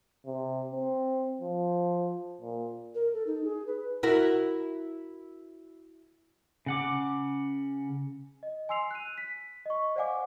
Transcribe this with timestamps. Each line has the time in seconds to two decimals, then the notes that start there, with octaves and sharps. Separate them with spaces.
0.26 C3
0.72 C4
1.41 F3
2.41 A#2
2.95 A#4
3.13 A4
3.27 D#4
3.44 G#4
3.67 B4
4.03 E4 F#4 A#4
6.66 C#3 F#5 D6
8.43 D#5
8.69 G#5 C6 E6 C7 F7
8.91 F#6 D#7
9.18 B6
9.66 D#5 C#6
9.96 C5 D5 F5 F#5 G#5 D6